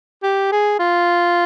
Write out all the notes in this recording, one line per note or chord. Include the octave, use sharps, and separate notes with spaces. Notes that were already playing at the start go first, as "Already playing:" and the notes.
G4
G#4
F4